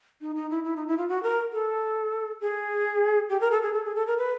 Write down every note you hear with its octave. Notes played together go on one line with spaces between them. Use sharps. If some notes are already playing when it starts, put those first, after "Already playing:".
D#4
D#4
E4
E4
D#4
E4
F4
F#4
A#4
A4
G#4
G4
A#4
A4
G#4
A4
G#4
A4
A#4
B4